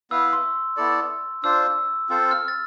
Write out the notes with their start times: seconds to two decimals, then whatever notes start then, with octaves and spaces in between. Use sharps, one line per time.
0.11 B3 E4 B4 F5 E6
0.33 C6
0.77 B3 E4 A4 D5
1.43 D4 F4 C5 E6
2.09 C4 F4 A4 C5
2.31 F6
2.48 A6